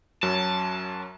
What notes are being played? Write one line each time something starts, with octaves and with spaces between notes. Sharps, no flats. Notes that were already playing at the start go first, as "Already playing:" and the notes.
F#2 F#3 C#4 A5